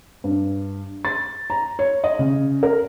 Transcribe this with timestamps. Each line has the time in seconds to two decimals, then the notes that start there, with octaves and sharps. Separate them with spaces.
0.24 G2
1.05 A6
1.50 A#5
1.79 C#5
2.04 D#5
2.19 C#3
2.63 A#4